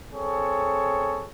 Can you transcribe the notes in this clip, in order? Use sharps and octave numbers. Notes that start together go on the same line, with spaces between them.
C4 G#4 A4 C#5